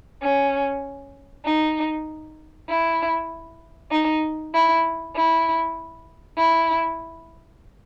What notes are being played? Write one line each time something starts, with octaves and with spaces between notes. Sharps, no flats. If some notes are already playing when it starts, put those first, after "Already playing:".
C#4
D#4
E4
D#4
E4
E4
E4